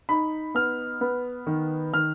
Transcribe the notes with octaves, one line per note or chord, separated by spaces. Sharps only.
D#4 B5
B3 F6
B3
D#3
D#3 F6